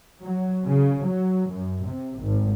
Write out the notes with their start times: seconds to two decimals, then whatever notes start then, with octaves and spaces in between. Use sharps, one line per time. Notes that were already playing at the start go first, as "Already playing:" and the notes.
0.21 F#3
0.65 C#3
1.04 F#3
1.50 F#2
1.84 C3
2.19 G#1